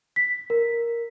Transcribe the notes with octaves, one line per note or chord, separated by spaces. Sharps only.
B6
A#4